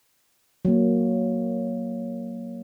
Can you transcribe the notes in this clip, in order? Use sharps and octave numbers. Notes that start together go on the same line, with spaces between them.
F#3 A#3